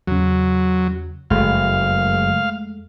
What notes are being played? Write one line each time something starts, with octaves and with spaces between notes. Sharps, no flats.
E2 C#3 F#3
F#1 F2 G#3 A3 F5